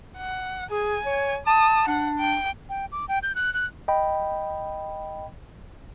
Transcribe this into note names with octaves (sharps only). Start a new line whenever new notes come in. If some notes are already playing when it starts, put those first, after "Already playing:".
F#5
G#4 G#5
C#5
A5 D#6
D4 F#5
G5
G5
D6
G5
G6
F#6
F#6
D#5 G5 B5